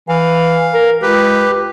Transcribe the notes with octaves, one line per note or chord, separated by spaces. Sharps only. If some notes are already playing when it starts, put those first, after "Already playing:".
E3 F5
A#4
C#2 G4 B4